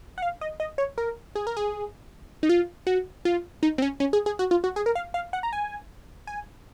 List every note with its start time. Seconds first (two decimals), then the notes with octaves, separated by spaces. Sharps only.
0.18 F#5
0.22 F5
0.41 D#5
0.60 D#5
0.78 C#5
0.98 A#4
1.35 G#4
1.47 A#4
1.57 G#4
2.43 D#4
2.49 F4
2.87 F#4
3.25 F4
3.63 D#4
3.78 C4
3.82 C#4
4.00 C#4
4.13 G#4
4.26 G#4
4.39 F#4
4.51 F4
4.64 F#4
4.76 G#4
4.86 A#4
4.95 F5
5.14 F5
5.33 F#5
5.43 A#5
5.53 G#5
6.27 G#5